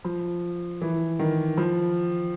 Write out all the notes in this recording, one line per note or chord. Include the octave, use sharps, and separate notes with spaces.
F3
E3
D#3
F3